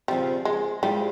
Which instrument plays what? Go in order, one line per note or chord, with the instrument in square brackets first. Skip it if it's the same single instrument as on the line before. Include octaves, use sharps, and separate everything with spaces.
[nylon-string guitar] C#3 F3 C4 [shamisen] G3
[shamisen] G#3
[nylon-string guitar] F3 G#3 E4 G4 C5 [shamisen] G3